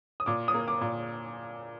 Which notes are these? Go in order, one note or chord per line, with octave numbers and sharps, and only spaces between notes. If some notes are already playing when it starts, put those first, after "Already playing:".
D#6
A#2 D6
D#6
A#3
D6
A#2